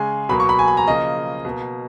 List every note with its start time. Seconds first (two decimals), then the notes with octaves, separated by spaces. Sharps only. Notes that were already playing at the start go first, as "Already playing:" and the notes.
Already playing: C#3 G#3 G#5
0.29 B2 F#3 A#3 B5
0.40 C#6
0.49 B5
0.59 G#5
0.68 B5
0.77 A#5
0.87 C#3 F3 A#3 D#5
1.45 B2 A#3